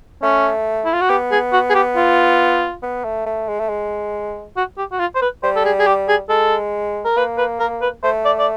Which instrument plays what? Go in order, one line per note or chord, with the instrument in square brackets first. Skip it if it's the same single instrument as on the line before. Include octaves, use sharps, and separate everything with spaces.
[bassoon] A3 [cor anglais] C#4
[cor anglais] E4
F4
F#4
[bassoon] B3 [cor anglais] G4
[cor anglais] G#4
F#4
G#4
G4
F4
[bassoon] B3
A3
A3
G#3
A3
G#3
[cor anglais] F#4
G4
F#4
F4
C5
B4
[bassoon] G3 [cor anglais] C5
[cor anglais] A4
G#4
G#4
G4
G#4
[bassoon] G#3 [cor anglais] A4
[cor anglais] A#4
[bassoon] A#3 [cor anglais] B4
[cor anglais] B4
A#4
B4
[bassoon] A3 [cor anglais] C5
[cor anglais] D5
D5